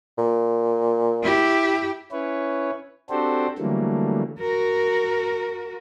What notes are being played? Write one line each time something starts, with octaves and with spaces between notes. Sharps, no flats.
A#2
E4 G4
C#4 E4 B4 C#5
C4 D4 F#4 G4 A4 C5
D3 E3 F#3 G3 A3 A#3
F#4 A#4